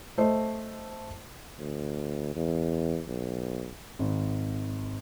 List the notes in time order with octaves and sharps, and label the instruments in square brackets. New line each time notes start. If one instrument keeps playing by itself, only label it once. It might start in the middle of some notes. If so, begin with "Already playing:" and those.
[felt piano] A3 C5 D#5
[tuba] D2
E2
B1
[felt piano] G#1